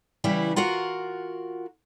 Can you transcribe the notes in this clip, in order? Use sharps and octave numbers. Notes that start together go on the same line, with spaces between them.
C#3 E3 G3 E4
F4 F#4 A#4 F#5